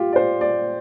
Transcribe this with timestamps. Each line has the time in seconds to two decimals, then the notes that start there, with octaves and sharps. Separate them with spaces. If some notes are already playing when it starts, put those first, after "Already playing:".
Already playing: F4 G4
0.13 D5
0.16 C5
0.41 D5